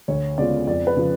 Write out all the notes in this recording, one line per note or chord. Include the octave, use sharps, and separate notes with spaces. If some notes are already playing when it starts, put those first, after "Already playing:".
D2 C#5
C#3 G#3 B3 F4 D5
F2 D5
B4
C#3 F3